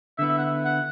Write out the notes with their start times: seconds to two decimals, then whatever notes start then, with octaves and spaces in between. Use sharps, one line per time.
0.18 D3 B3 E4 E5
0.29 E5
0.39 F#5
0.65 F#5